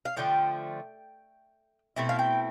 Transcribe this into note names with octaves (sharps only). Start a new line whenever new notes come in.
F5
D3 F3 A3 G5
B2 A3 C4 E4
F5
G5